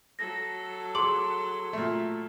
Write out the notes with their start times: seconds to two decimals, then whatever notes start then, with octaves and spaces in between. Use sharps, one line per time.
0.19 F#3 A4 A#6
0.95 G#4 C6 D6 F#7
1.73 A#2 A3